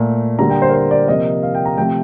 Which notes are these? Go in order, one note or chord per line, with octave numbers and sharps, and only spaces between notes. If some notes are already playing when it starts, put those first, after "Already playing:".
Already playing: A#2 A3
D3 G3 A#3 A#5
G5
C5
A#4
C5
D5
C3 F3 A#3 D#5
F5
G5
A#5
C3 F3 A3 G5